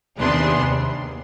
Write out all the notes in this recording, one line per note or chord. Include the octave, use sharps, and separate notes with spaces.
D#2 C3 B3 D4 G#4 C6
D#2